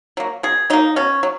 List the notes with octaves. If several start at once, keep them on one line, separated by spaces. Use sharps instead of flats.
F#3 A#3
B2 G#4
F#3 A#3 D#4
B2 C#4
F#3